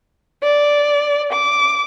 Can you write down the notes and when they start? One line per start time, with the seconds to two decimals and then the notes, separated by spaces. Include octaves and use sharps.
0.43 D5
1.33 D6